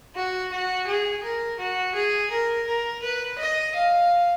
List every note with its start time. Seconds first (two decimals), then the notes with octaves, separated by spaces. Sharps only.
0.15 F#4
0.51 F#4
0.87 G#4
1.23 A#4
1.59 F#4
1.95 G#4
2.30 A#4
2.67 A#4
3.02 B4
3.38 D#5
3.75 F5